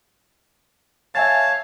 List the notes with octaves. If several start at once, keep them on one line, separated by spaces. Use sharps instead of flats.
C#5 E5 F5 G#5 A5 A6